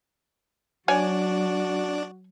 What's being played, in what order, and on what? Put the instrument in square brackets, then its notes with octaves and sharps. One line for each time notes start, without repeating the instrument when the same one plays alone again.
[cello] F#3 [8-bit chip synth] D4 D5 [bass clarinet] F#4 [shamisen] C#5 G#5